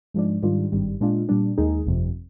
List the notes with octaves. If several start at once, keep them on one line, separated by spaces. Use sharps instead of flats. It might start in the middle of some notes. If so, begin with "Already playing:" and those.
G#2 F3 G#3 D4
G#2 D#3 G3 D4 F4
G#1 G2 D#3 G3
A#2 G#3 D4 F4
A#2 G3 D4
D#2 D#3 G#3 D#4 G#4
G1 F2 C3